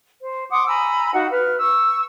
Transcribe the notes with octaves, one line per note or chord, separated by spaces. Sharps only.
C5
F#5 C6 D6 D#6
G#5 A#5 B5 E6
D#4 F#4 F5 F#5
B4 F6
C#6 E6